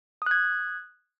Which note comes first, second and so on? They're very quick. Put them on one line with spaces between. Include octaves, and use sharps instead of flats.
D#6 F#6 G#6